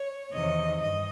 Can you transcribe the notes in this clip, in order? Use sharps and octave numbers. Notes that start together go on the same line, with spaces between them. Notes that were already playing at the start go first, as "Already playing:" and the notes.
Already playing: C#5
E2 C3 D#3 D#5
G2 D#5